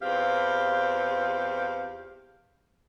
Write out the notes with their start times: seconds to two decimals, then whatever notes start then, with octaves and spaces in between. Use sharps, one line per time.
0.02 E2 C4 F4 G4 F5